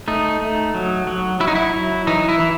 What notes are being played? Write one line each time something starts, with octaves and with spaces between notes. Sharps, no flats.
A3 D#4
A3
F#3
F#3
F#3 E4
D#4
E4
F#3
E3 D#4
E4
E3